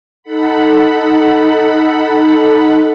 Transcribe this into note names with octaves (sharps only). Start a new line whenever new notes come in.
D#4 A4 F#5 B5